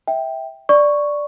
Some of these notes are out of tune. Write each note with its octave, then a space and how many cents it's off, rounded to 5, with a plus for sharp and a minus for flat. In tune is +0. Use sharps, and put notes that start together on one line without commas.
E5 -15 G5 +0
D5 +0 C#6 +0